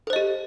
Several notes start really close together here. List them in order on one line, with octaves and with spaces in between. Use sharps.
A4 C5 D#5 G4